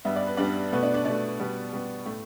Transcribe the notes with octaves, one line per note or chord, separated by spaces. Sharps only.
G2 G3 B3 E5
D5
B4
G2 G3 B3 D4 D5
B2 A3 B3 B4
D4 D5
D4 D5
B2 A3 D4 D5
B2 G3 B3
B2 G3 B3
A2 A3